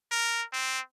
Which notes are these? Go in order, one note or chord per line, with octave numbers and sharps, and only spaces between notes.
A#4
C4